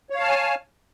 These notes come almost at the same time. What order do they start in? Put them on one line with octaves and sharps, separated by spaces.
C#5 F5 A5 F6 G#5